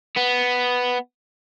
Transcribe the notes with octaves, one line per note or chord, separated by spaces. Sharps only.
B3